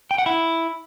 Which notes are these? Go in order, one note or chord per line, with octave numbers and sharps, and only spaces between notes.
G5
F#5
E4